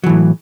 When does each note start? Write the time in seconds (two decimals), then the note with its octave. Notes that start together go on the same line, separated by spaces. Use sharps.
0.04 F#3
0.06 E3
0.09 A2